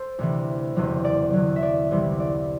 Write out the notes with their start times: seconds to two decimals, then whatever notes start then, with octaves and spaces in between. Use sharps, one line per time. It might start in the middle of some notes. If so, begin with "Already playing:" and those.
Already playing: A4 C5
0.19 D2 C3 E3
0.76 F#1 E2 C3 F#3
1.05 D5
1.33 E2 D3 F#3
1.56 E5
1.63 D5
1.91 C2 C3 E3
2.20 D5